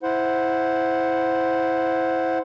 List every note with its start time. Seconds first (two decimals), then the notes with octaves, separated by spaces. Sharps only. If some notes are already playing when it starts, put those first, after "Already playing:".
0.03 E4 C5 F#5